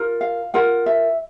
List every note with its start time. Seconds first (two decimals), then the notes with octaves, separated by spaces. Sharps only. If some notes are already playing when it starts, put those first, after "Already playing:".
Already playing: F4 A#4
0.21 F5
0.54 F4 A#4 F#5
0.86 E5